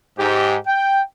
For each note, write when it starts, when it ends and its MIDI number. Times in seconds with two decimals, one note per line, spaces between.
0.19 0.56 44
0.19 0.56 67
0.66 1.01 79